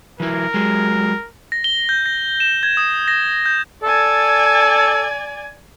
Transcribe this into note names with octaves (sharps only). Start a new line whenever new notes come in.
E3 F#3 E4 A#4
F#3 G#3
A#6
G7
G6
A#6
E7
G#6
D#6
A#6
G6
A4 D5 G#5